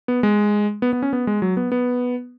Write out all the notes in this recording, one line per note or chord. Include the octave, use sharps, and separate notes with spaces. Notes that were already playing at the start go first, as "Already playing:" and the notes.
B3
G#3
B3
B3
C#4
B3
G#3
F#3
B3
B3